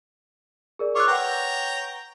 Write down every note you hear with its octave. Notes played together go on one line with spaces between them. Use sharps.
G#4 A#4 D5
F4 C#5 D6 E6 F#6
B4 C#5 F#5 G5 A#5